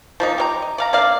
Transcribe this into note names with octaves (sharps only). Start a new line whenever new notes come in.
F3 A#3 D#4
G4 C#5 A#5
D#5
D5 F5 A#5
A#3 D4 D5 F5